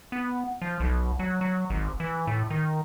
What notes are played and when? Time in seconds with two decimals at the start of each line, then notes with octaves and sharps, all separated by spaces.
0.12 B3
0.62 F3
0.80 B1
1.19 F#3
1.41 F#3
1.70 G#1
2.00 E3
2.27 A2
2.50 D#3